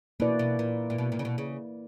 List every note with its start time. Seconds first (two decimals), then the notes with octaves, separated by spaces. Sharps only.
0.20 B2 A#3 E4 B4 D5
0.39 B2
0.59 A#2
0.90 A#2
0.98 B2
1.12 A#2
1.19 C#3
1.25 B2
1.38 C#3